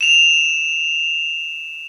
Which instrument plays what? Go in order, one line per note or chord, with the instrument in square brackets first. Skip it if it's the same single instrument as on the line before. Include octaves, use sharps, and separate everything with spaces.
[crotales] E7 F7